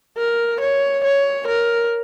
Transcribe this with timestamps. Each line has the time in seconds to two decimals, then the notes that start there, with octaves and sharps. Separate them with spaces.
0.17 A#4
0.61 C#5
1.04 C#5
1.48 A#4